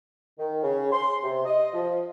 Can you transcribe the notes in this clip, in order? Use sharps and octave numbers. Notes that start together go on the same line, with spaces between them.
D#3
C#3
C6
C3
D#5
F3